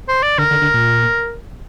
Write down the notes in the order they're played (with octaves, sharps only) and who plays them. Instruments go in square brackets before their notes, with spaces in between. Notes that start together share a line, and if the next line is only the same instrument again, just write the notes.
[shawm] C5
D5
[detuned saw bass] D3 [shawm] A#4
[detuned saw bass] D3
D3
A#2